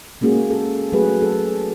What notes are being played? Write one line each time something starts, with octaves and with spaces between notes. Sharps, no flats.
G#3 A#3 C#4 F#4 G#4
A4
F#3 A3 F#4 G#4 B4
A4